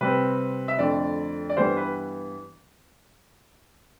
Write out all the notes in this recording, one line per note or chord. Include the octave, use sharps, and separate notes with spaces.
C3 G3 C4 B4
E5
F2 D3 A3 D5
D5
G2 E3 G3 B3 C5
B4